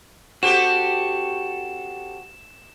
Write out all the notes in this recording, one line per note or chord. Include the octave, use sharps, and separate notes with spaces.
C4 F#4 G4 A4 E7